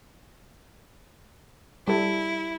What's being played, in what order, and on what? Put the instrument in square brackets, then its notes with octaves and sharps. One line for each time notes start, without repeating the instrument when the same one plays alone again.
[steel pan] G3 A4 [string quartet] E4